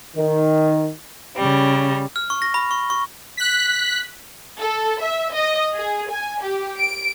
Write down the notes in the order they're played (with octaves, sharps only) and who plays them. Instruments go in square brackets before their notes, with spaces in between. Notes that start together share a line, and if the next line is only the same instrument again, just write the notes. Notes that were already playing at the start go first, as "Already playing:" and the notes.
[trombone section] D#3
[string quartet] C#3 G3
[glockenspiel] F6
C#6
A#6
B5
C#6
C#6
[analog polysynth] F#6 B6
[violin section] A4
E5
D#5
G#4
G#5
G4
D7